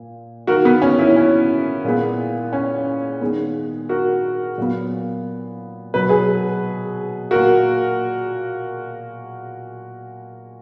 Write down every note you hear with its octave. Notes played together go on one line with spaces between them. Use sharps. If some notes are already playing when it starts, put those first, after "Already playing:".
Already playing: A#2
D#3 A#3 F#4 A#4
B3
C#4
C#4 E4
C#4
A#2 G#3 B3
C#4
D#3 G#3 B3
F#4 A#4
A#2 F#3 B3
B2 F#3 B3 B4
G#4 B4
A#2 A#3 F#4 A#4